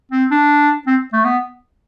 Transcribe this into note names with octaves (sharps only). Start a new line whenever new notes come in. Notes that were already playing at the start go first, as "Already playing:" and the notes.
C4
D4
C4
A3
B3